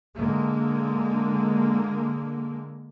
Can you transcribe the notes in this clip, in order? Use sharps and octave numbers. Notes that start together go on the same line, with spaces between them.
D3 G#3 A#3